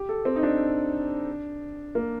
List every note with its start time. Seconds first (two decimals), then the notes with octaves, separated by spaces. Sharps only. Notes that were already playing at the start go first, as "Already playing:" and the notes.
Already playing: G4
0.09 A4
0.25 C4
0.36 D#4
0.43 D4
1.95 A#3